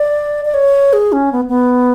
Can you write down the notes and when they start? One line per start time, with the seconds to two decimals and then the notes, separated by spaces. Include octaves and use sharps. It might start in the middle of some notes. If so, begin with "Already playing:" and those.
Already playing: D5
0.45 D5
0.54 C#5
0.93 G#4
1.12 C#4
1.32 B3
1.49 B3